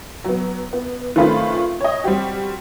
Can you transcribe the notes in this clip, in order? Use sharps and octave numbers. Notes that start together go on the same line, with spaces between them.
F#3 B3
B3
D#3 A3 C4 C#4 F4 B4
C#5 D#5
G3 C4 F#4 G4